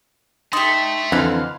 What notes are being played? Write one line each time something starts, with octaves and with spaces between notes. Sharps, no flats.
D#4 G4 E5 A5 C6
F2 D3 E3 F5